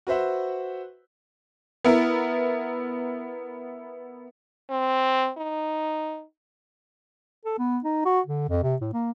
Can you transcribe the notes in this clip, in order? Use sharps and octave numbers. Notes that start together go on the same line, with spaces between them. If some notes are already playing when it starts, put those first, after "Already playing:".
F#4 B4 C5 E5 F#5
B3 E4 A#4
C4
D#4
A4
B3
D#4
F#4
D3
F2
C3
A2
A#3